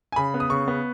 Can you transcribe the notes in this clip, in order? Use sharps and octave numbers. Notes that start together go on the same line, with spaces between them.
G#5
C#3 B5
B3
D#6
C#3 C#6
B3